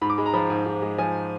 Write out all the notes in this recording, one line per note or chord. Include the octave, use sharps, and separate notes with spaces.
G#2 B5
D6
G#3 B5
A#5
F3 B5
G#2
G#2
G#3
F3 G#5